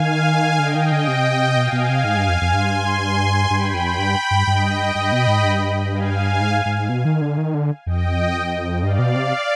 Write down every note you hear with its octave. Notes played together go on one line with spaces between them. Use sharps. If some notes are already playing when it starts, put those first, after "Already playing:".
Already playing: D#3 F5 G#5
D3 D#5 G5
D#3
D3
C3
B2 F5 G#5
B2
C3
G#2
G2
F2
F2
G2 G#5 C6
G2 G5 B5
F2
G2
G2
G2 D#5 G5
G2 G5 B5
B2
G#2
G2
F5 G#5
G#2
G#2
B2
D#3
D3
D#3
D3
F2 D#5 G5
G2 D5 F5
B2
C3